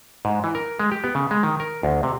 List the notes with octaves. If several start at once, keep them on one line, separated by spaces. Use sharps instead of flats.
G#2
E3
A#4
G#3
G4
B3
C#3
G#3
D#3
A#4
D2
C3